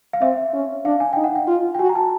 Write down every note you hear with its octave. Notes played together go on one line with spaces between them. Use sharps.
F5
C4 E5
C#4
D4 F5
G#5
D#4 G5
F#5
G5
F4
G5
F#4 G#5
A#5
A5